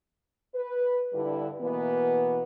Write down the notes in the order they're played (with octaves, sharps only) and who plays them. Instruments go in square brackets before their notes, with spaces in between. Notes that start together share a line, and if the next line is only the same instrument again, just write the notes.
[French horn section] B4
G2 D3 G3 E4 B4
B2 E3 A#3 B3